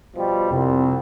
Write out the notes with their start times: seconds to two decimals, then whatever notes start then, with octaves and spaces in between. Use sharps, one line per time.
0.16 B2 F3 G3
0.50 C2 F2 C3